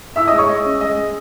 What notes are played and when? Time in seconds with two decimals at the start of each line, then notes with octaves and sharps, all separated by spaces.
0.16 E4 E5 E6
0.27 D#5 D#6
0.32 G#3
0.38 C#5 C#6
0.49 G#3 D#5
0.65 C#4
0.81 G#3 D#5
0.98 G#3